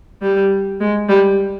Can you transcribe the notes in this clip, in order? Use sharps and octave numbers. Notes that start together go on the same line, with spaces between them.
G3
G#3
G3